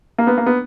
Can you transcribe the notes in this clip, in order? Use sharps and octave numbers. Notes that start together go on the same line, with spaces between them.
A#3
B3
A#3
B3